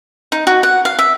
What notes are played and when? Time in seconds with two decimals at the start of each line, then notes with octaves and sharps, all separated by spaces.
0.32 D#4
0.47 F#4
0.63 F#5
0.85 F5
0.99 E5